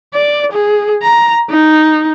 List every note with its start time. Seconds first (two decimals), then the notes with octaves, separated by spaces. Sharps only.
0.14 D5
0.52 G#4
1.02 A#5
1.50 D#4